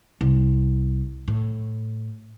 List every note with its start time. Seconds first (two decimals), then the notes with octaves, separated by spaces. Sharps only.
0.21 C2
1.28 A2